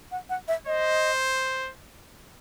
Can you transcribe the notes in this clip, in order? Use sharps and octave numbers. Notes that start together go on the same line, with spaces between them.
F#5
F#5
E5
C5 D#5